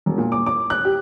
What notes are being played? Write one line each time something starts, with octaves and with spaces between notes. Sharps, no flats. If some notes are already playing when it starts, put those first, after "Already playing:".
E1
A#2
D6
D6
F#6
G4